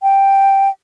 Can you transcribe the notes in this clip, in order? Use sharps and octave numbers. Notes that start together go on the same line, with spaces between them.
G5